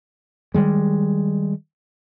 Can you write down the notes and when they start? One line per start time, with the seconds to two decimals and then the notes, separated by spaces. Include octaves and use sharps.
0.54 D#3 G3 G#3